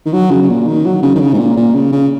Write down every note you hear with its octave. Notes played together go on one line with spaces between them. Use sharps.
D#3
F#3
C#3
C#3
A#2
D#3
F#3
C#3
D#3
C#3
G#2
A#2
A#2
C#3
C#3